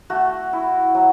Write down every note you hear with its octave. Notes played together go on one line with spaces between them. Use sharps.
A3 F#4
E4
F#3